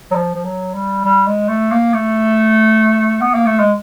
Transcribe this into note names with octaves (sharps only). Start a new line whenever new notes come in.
F#3
F3
F3
F#3
G3
G3
G#3
A3
A#3
A3
B3
A#3
A3
G#3